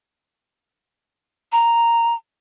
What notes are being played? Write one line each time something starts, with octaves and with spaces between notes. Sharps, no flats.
A#5